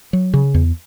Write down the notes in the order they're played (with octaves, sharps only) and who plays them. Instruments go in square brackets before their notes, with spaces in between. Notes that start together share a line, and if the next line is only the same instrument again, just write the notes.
[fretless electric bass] F#3
C#3
E2